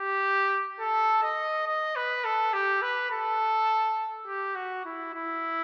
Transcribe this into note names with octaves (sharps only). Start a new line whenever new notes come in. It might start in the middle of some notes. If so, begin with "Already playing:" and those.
Already playing: G4
A4
D#5
D#5
B4
A4
G4
B4
A4
G4
F#4
E4
E4